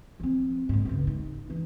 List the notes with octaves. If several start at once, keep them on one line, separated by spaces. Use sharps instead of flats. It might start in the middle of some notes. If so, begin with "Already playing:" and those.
F3 C4
A#1 G#2
G1 C#2
D#4
E3 D#4